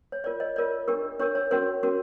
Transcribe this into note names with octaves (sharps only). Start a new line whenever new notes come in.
C#5
F4 A#4 C#5 D5
C#5 D#5
F4 A#4 C#5 D5
D4 G4 A#4
D4 G4 A#4 C#5
C#5
C#4 F#4 A#4 C#5
C#4 F#4 A#4